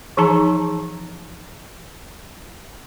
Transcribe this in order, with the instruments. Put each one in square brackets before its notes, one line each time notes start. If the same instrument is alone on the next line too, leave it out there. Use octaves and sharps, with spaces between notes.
[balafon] E3 F3 D#4 G#4 A5 A#5